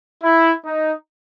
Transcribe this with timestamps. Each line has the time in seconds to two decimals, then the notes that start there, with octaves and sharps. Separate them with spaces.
0.23 E4
0.64 D#4